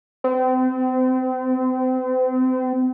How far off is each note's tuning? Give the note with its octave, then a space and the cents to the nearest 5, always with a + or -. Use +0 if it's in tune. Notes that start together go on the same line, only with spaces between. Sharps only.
C4 -35